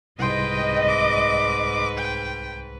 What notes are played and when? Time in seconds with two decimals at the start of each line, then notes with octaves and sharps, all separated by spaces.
0.19 C2 G#2 B4 D#5 G5 C6
0.88 D6
1.98 G5